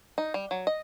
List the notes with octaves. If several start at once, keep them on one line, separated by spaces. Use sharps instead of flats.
D#4
G3
F#3
D#5